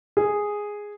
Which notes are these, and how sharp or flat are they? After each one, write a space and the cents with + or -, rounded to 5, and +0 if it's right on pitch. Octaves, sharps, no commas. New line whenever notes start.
G#4 -5